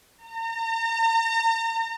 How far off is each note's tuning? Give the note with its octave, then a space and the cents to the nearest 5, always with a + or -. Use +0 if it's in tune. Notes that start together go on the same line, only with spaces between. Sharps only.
A#5 -40